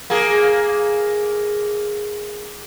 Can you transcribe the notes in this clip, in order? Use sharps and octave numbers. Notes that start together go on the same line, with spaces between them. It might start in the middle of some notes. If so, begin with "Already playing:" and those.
A#3 G#4